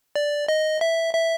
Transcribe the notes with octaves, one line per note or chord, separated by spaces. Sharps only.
D5
D#5
E5
E5